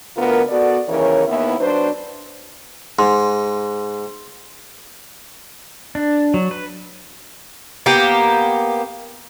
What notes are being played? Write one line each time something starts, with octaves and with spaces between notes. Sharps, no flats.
D2 B3 F4 A#4
B3 F#4 A4 D5
D#2 C#3 E3 A#4 C#5
D#2 B3 E4
F#3 D4 B4 C5
G#2 C6
D4
F#3
B4
A#3 B3 G4